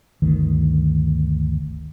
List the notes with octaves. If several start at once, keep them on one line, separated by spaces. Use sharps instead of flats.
G1 D2 D#3